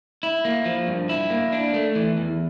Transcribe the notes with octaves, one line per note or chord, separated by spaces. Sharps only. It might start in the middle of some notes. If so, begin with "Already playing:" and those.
E4
A#3
F3
G2
E4
A#3
D4
A3
E3
E2